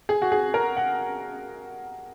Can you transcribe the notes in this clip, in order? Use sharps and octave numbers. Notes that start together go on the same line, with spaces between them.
G#4
F#4
G#4
A#4
F#5